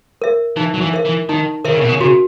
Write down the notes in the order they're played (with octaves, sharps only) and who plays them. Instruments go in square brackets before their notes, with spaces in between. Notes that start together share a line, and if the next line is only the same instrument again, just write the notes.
[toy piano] A#4 E5
[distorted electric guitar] E3 [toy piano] D#4
[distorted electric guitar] F#3
E3
[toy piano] A#4 E5
[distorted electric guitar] E3
[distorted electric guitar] D#3 [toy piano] D#4
[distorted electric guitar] D#3 [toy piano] A#4 E5
[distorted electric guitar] C#3
B2
C#3
[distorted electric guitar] C#3 [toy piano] F#4